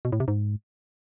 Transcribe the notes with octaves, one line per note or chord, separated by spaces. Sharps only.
B2
A2
C3
G#2